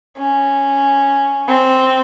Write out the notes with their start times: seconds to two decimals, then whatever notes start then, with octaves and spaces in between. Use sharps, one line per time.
0.17 C#4
1.48 C4